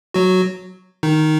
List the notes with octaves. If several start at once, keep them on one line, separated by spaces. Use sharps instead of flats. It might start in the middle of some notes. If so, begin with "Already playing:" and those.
F#3 F#4
D#3 D#4